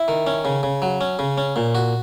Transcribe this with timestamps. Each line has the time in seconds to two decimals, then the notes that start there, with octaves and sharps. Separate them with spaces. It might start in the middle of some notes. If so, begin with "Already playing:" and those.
Already playing: E4
0.08 D#3
0.27 C#4
0.45 C#3
0.63 C#3
0.82 F#3
1.01 C#4
1.19 C#3
1.38 C#4
1.56 A#2
1.75 F#4